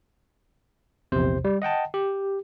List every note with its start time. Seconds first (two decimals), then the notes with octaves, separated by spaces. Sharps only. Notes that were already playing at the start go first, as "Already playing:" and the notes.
1.12 A#1 E2 C3 C5
1.45 G3
1.62 D#5 F#5 G5 A5
1.94 G4